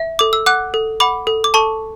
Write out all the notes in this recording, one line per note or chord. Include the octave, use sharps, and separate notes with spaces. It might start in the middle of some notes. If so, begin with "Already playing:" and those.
Already playing: E5
A4 D6
E6
F#5 D6 F#6
A4
F#5 B5 D6
A4
D6
A4 A5 C#6